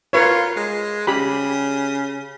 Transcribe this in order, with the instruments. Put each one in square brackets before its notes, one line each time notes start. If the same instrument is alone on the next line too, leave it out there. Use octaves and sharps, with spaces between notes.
[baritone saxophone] F4 [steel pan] A#4 B4 C#5
[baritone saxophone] G#3
[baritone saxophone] C#3 [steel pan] G4 B5